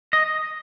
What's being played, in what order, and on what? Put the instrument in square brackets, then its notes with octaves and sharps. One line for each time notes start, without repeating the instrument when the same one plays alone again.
[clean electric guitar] D#5